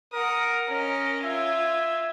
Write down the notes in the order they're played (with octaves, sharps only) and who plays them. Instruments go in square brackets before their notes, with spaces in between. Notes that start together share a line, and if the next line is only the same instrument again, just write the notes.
[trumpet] A#4 [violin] F#5 D#6
[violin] C#4 D#5 [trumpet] A#4
[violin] F4 G#6 [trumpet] E5